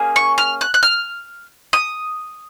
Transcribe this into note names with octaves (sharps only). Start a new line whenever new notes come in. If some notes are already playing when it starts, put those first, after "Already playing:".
Already playing: A#3 C#4 G#4
C#6
F6
F#6
F#6
F6
D#6